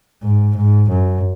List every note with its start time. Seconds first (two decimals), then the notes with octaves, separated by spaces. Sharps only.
0.23 G#2
0.56 G#2
0.90 F#2